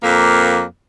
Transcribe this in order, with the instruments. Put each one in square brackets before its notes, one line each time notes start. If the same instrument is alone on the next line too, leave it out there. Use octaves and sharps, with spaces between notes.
[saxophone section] F2 A#3